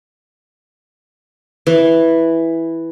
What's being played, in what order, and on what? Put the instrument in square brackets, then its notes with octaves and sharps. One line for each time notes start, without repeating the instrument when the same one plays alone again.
[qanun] E3